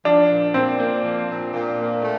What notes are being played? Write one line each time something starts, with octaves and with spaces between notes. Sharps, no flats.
F3 D4
A#2
A#2 C4
A#3
F3
A#2
A#2
A#3
A3